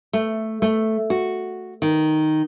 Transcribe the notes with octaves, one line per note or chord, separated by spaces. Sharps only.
A3
A3
F#4
D#3